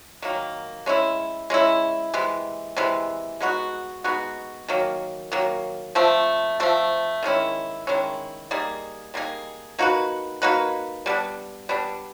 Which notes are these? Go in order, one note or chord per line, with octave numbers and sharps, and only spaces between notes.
D#3 F#3 A#3
G#3 C#4 E4
G#3 C#4 E4
C3 E3 G#3
C3 E3 G#3
G#3 B3 D#4 F#4
G#3 B3 D#4 F#4
D#3 F#3 A#3
D#3 F#3 A#3
F3 A3 C4
F3 A3 C4
D#3 G#3 C#4 E4
D#3 G#3 C#4 E4
G3 A#3 D#4 G#4
G3 A#3 D#4 G#4
A#3 D#4 F#4 B4
A#3 D#4 F#4 B4
G3 B3 D4
G3 B3 D4